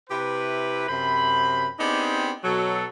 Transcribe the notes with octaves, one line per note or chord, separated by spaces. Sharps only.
C3 E4 G4 B4
F#2 C3 C5 B5
B3 C4 D4 D#4 G4 G#4
B2 F#3 A4